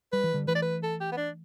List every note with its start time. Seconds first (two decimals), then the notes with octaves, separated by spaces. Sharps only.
0.12 G3 B4
0.24 E3
0.34 D3 G3
0.48 E3 A3 B4
0.55 D5
0.62 B4
0.83 A4
1.01 G4
1.12 B3
1.17 D4